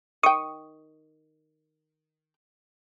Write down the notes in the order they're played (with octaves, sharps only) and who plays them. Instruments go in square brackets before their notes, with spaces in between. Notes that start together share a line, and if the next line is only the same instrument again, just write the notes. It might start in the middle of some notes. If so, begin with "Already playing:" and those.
[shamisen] D#3 G5 [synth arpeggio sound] C#6 D#6